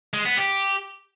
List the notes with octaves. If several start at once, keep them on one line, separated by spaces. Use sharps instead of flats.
G#3
B3
G4